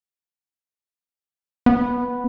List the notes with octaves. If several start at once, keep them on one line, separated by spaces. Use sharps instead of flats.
B3